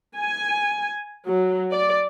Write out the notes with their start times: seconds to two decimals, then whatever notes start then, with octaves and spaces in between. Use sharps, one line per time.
0.18 G#5
1.26 F#3
1.72 D5